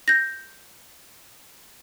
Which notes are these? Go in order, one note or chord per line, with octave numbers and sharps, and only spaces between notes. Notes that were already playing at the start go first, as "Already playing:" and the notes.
G6 A#6